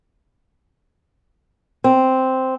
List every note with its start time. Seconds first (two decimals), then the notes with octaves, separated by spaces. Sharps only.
1.84 C4